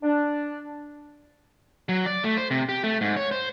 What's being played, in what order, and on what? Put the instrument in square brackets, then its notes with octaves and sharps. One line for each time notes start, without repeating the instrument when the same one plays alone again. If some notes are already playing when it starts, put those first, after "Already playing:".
[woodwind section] D4
[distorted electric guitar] F#3
D5
A3
C5
C3
G4
A3
G#2
C#5
C5